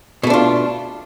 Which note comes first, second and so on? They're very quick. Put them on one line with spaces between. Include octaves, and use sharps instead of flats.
B2 A3 D4 F4